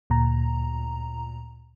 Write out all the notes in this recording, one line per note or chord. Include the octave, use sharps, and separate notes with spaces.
D2 A#2 A#5